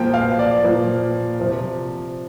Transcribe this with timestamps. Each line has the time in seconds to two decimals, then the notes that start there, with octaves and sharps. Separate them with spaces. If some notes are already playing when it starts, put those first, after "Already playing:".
Already playing: A#2 F3 A#3 G5
0.14 F5
0.39 D5
0.63 A#2 F3 A#3
1.39 C3 F3 C4